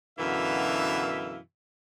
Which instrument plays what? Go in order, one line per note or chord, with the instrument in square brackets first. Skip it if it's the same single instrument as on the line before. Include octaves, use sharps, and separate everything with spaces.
[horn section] F#2 B2 D3 E3 E5 F5